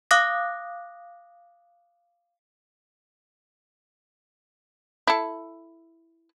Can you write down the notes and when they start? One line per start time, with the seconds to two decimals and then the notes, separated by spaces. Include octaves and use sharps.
0.11 F5 D6 D#6 F#6 A#6
5.07 E4 A4